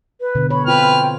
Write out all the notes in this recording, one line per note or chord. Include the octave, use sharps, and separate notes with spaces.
B4
B2 D3
C#5 B5
C4 F4 B4 C5 G5 F6